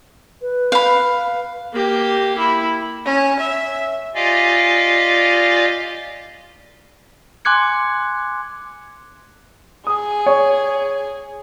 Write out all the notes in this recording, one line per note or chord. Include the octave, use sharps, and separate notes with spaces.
B4
F5 B5
A#3 G4
E4
C#4
E5
F4 G4 D5 D#5 F5 G#5
G#5 C6 D6 F#6 G#6 C#7
G#4 D#6
C#5